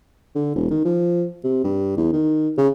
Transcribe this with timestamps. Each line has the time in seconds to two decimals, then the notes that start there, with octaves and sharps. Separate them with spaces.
0.35 D3
0.55 E1
0.71 D#3
0.85 F3
1.44 C3
1.64 G2
1.97 E2
2.12 D#3
2.58 C#3